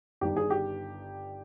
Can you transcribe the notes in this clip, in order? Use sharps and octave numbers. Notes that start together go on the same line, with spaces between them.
G1 G2 D#3 G4
G#4
G4